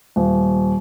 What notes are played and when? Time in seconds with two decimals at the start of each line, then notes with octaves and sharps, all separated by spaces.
0.16 D#1